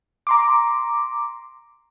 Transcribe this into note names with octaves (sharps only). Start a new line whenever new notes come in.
A#5 C6 D6